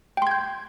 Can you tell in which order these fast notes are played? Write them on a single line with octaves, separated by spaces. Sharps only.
G5 C6 G#6 G6